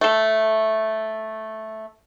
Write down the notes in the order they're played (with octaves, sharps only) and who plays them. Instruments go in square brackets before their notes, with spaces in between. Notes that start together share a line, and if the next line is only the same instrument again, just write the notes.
[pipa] A3 A4